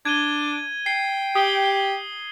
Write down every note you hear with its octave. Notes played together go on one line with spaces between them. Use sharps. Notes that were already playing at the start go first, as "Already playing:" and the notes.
D4 G#6 D#7 G7
G5 C7
G4 D#6 G7